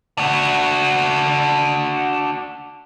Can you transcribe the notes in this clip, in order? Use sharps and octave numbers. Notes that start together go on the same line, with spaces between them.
D4 F#4